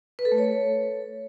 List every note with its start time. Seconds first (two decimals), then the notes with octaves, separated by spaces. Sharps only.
0.19 B4
0.25 A4
0.32 A3
0.38 C#5